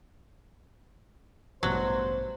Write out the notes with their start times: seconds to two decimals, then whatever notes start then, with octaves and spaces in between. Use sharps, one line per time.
1.63 A1 G2 B2 F#3 C5